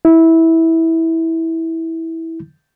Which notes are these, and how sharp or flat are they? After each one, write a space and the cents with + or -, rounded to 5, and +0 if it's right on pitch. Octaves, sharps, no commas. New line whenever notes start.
E4 -15